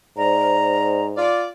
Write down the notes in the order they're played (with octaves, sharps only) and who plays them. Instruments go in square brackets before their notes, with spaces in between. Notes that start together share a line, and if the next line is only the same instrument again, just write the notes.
[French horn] G#2 [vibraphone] C5 D5 [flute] A#5
[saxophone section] F4 D5